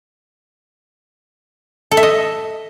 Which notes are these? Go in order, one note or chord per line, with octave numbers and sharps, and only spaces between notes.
A4
E5
D#5